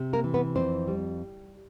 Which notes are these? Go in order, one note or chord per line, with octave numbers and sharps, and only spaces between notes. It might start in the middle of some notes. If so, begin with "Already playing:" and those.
Already playing: C3
A#3 A#4
E3
B3 B4
F2 C4 C5
G3